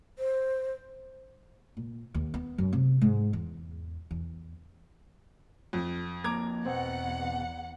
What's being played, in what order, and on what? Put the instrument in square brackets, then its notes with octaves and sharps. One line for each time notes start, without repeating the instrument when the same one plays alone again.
[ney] C5
[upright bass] A#2
D#2
B3
F#2
C3
G#2
E2
E2
[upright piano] F2
[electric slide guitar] F2 A#3 [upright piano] A#5 D6 G#6
[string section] E2 F#5 [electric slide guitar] B2 [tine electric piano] B3 C4 C5